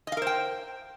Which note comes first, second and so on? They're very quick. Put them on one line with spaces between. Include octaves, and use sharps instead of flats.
D#5 F5 A#4 C5 G5